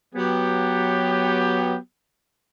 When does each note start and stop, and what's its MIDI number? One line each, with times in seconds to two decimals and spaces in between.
0.15 1.76 54
0.15 1.76 59
0.15 1.76 67